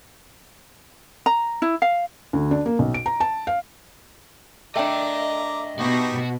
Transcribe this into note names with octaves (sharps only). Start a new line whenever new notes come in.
A#5
E4
F5
D2
D4
A#3
B1
D7
A#5
A5
F5
A3 D4 D#5 G5 A#5 D6
B2 D#4 F#4 G4 C#6